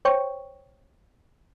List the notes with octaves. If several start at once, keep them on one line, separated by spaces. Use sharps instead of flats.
C5 C#5 G5 C#6